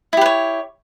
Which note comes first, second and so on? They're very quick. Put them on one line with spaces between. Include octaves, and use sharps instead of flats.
E4 G4 B4 C#5